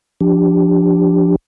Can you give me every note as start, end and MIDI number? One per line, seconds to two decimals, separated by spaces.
0.21 1.36 53
0.21 1.36 62
0.21 1.36 67